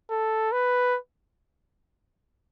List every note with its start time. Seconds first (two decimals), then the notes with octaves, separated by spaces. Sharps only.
0.10 A4
0.52 B4